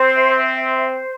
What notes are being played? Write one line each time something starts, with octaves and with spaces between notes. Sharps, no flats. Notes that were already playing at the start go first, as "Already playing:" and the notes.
Already playing: C4 C5
E5
C5